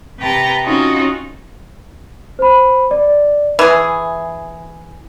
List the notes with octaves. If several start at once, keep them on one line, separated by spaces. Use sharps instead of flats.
C3 B4 G5 A5 A#5
C4 C#4 D#4 F4 F#4
C5 B5
D5
E3 E4 G#4